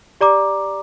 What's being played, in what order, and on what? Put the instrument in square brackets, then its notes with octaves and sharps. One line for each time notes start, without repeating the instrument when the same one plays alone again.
[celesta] G4 D5 A#5 D6